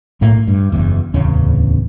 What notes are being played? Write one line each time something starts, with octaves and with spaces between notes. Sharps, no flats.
B1 A2 A3 A#3
G2
F#1 E2
D1 E2 C#3 C#4